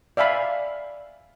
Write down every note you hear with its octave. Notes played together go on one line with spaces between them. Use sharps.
D5 E5 F5 G#5 B5